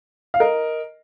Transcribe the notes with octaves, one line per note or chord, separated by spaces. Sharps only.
F5
A#4 D#5